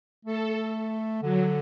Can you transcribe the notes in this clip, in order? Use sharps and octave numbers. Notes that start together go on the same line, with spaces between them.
A3 A4
D3 F#3